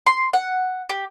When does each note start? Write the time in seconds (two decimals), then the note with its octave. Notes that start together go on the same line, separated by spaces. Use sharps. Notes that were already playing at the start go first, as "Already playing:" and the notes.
0.06 C6
0.33 F#5
0.89 G4